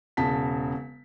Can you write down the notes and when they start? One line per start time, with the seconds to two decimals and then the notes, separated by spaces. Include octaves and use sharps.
0.17 E1 C#3 A5 B6